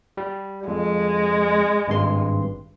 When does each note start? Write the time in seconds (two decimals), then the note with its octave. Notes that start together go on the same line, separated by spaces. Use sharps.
0.17 G3
0.68 F2 G#3
1.88 G#1 G2 C6